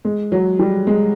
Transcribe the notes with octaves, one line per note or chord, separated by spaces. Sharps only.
G#3
F#3
G3
G#3